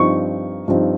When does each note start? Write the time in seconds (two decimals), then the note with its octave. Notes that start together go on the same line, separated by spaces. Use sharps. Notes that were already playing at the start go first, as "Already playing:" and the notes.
Already playing: G2 F3 C4 D#4 C#6
0.68 G2 F3 C4 D#4